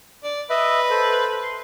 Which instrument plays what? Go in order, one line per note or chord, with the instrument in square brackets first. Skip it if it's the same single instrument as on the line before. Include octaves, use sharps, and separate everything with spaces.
[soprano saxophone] D5
[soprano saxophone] B4 [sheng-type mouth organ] D#5 E5
[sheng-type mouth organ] A4 C5
C6